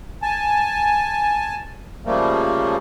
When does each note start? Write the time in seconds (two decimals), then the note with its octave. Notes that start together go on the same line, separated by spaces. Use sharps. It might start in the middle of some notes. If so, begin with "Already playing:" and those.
0.22 G#5 A5
2.05 C#3 F3 G3 A3 A#3